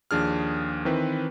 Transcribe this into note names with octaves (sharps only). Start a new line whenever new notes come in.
D#2 F3 D4 G#4 F6
D#3 E3 C4 B4